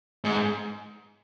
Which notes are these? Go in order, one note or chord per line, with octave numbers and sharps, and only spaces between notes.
G#2